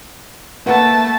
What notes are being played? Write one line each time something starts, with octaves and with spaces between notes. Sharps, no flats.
A3 A#3 B4 F#5 A5